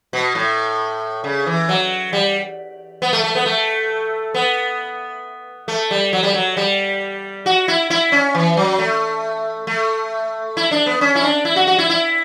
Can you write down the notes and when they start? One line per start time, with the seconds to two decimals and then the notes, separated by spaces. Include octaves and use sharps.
0.13 B2
0.35 A2
1.24 C#3
1.46 E3
1.69 F#3
2.13 G3
3.02 B3
3.13 A3
3.24 A3
3.35 B3
3.46 A3
4.34 B3
5.68 A3
5.91 G3
6.13 F#3
6.23 G3
6.34 F#3
6.57 G3
7.46 F#4
7.68 E4
7.90 E4
8.12 C#4
8.35 E3
8.57 F#3
8.79 A3
9.67 A3
10.57 E4
10.71 D4
10.86 B3
11.01 C#4
11.15 E4
11.24 D4
11.45 E4
11.56 F#4
11.67 F#4
11.78 E4
11.90 E4